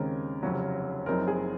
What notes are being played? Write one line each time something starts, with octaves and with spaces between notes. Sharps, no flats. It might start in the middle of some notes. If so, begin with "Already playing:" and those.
Already playing: D#2 C#3 G#3 C4 A#4
F1 F2 C#3 F#3 C#4
F#1 F#2 F3 C4 D#4 A#4
G#4